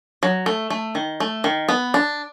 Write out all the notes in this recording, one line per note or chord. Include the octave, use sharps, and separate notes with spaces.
F#3
A3
A3
D#3
A3
D#3
B3
D4